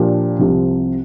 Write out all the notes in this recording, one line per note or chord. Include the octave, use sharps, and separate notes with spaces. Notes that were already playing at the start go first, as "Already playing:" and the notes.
Already playing: A#2 F3 D4 G4
C2 C3 F3